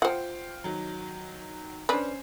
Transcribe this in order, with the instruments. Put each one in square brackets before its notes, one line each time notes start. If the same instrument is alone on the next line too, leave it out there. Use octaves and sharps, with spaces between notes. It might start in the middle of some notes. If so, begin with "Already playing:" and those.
[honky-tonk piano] F4 G5 [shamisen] C5 F#5
[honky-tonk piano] D#3 F#3
[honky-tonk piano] C#4 C5 [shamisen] D4 B4